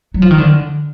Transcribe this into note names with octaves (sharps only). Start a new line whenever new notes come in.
F#3
F3
D#3
D3